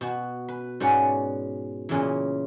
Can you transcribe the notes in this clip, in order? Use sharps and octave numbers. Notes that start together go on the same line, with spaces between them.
B2 F#4
B4
G#2 B2 C#4 D5 F#5
A#2 C#3 E3